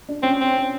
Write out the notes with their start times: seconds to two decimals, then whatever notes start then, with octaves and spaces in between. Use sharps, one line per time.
0.09 D4
0.23 C4 C#4
0.41 C4